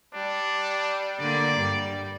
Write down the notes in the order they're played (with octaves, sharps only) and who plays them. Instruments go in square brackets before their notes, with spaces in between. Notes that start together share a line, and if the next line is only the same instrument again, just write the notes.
[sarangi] G3 [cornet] D4
[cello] D3 A#3 [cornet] D5
[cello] G2 [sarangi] G3